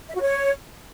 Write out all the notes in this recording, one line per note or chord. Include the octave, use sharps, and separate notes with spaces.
E5
F#4
C#5